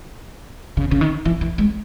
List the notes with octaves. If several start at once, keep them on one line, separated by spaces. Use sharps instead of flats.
C#3
C#3
D#3
E3
E3
G#3